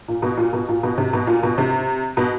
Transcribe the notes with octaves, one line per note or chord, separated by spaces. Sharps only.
A#2
B2
A#2
B2
A#2
B2
C3
B2
A#2
B2
C3
B2